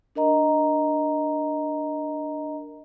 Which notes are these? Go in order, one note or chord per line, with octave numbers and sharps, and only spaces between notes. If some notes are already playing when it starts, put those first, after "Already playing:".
D4 A#4 D#5 A#5